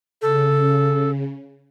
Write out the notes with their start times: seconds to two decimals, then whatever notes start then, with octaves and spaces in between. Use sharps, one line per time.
0.22 C#3 A4